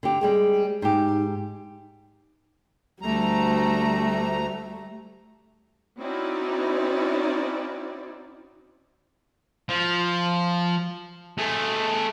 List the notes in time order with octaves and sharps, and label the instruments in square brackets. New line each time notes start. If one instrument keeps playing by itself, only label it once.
[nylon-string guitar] D3 G4
[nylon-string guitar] G3 G#3 C4 [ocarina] G#4
[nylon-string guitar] G#2 G4 [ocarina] D#4
[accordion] D2 A#5 [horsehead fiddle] G3 A3
[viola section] C4 C#4 D#4 E4 F#4 D5
[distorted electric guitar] F3
A3 G#4